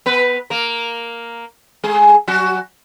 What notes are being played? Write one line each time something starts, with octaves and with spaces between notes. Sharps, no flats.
B3 B4
A#3 A#4
G#3 G#4
F#3 F#4